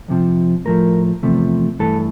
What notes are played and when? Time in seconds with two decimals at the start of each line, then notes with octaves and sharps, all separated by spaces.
0.08 F2 C3 F3
0.65 A2 F3 A3 A#4
1.23 E2 C3 F3 A3
1.79 G2 E3 A3 A4